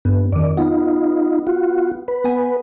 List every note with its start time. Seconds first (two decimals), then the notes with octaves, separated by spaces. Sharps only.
0.05 G2 B3
0.33 F2 D#3 D5
0.57 B3 D#4 F4
1.47 F4 F#4
2.08 B4
2.24 B3 G#5